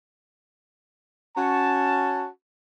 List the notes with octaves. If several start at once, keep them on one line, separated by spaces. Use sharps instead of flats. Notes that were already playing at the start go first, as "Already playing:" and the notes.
C#4 F#4 A5